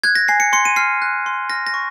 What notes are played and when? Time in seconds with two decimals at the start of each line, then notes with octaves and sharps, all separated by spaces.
0.04 F#6 G#6
0.15 A#6
0.28 G#5 C7
0.40 C#7
0.53 C6 C#7
0.65 D#7
0.76 F6 C7
1.02 F#6
1.26 C6
1.50 F6 A#6
1.67 A#6
1.74 C#6